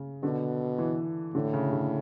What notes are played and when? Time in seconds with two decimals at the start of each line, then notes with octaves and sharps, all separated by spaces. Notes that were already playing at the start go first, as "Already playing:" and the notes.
Already playing: C#3
0.23 B2 D3
0.78 E3
1.34 A2 D3
1.53 C#3
1.72 D3